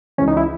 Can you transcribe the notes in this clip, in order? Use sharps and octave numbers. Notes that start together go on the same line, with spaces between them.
C#2 C#3 E3 C#4
D#4
E4